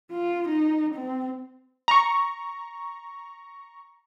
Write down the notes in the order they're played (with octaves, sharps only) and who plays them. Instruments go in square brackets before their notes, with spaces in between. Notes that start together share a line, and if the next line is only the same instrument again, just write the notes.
[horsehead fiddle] F4
D#4
C4
[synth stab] A#5 C#6